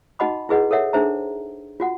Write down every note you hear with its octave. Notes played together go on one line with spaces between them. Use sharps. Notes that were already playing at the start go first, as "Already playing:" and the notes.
D#4 F#4 D#5 F#5 B5 D6
E4 F#4 G#4 B4 D#5 F#5
A4 A#4 C#5 E5 F#5
D4 D#4 G#4 C5 E5 A#5
F4 F#4 F#5